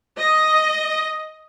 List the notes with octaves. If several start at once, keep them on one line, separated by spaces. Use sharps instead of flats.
D#5